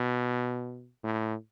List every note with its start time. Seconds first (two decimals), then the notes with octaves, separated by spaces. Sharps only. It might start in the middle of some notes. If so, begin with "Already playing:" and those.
Already playing: B2
1.03 A2